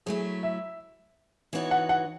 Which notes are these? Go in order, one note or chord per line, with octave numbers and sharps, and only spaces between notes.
F#3 A3 E4 G#4
E5
E3 B3 D#4 F#4 C#5
F#5
F#5